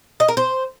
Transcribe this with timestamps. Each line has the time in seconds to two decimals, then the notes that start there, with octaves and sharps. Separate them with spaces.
0.20 D#5
0.28 A#4
0.37 C5